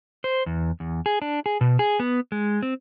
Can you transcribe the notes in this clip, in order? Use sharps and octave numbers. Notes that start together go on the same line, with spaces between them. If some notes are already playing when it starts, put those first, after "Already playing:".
C5
E2
E2
G#4
D4
G#4
B2
G#4
B3
G#3
C4